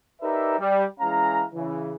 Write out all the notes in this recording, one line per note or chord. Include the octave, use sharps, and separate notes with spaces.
D#4 G4 A#4 B4 D5 E5
G3
E3 G#3 C#4 F5 A#5
C#3 E3